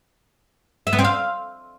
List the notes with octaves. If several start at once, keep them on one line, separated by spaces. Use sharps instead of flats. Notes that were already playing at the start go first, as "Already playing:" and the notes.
E5
B3
C4
F5